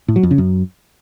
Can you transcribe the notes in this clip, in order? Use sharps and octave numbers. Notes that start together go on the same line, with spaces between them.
A2
F#3
F2
C#3
F#2